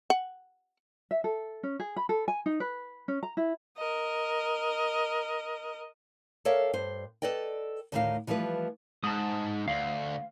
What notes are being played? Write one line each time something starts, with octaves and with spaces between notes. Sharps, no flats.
F#5
E5
A4
C#4
G#4
B5
A4
G#5
D#4
B4
C#4
A#5
E4
A#4 D#5
A4 A#4 C#5 D5 E5 F5
G2 C5
A4 B4 D5 D#5 G5
D2 A2 D#3 A3 F4 F5
E3 F3 G3 A3 B4
G#2 A5 D#6
D2 F5